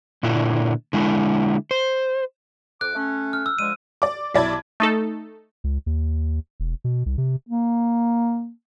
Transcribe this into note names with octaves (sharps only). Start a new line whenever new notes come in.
A#2 D3 D4 E4
D3 G#3 E4
C5
F2 D6 F#6
A3 C#4
F6
E6
D3 F3 G#3 D#7
D5 D6
B1 E4 D5 A5 B5 G#6
A3 D#4 A4
C#2
D#2
E1
B2
C2
C3
A#3